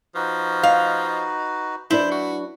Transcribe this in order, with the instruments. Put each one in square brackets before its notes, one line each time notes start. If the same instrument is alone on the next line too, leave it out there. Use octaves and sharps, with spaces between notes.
[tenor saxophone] F3 [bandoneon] D#4 F#4 B4
[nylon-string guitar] D#5 [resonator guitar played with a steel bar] F5
[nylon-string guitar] F#3 D4 B4 [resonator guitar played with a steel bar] E4 [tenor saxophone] C5
[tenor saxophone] F#4